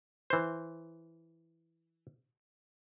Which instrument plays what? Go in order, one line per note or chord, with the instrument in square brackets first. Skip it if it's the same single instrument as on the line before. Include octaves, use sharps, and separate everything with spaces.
[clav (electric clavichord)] E3 C5